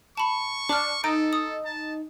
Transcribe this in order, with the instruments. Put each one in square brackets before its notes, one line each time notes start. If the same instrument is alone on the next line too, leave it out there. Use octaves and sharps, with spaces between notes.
[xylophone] A5 B5 [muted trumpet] C#6
[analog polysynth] D4 [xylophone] D6 F6
[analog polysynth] D#4 [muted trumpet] A4 [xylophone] D7
[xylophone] D#6
[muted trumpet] A5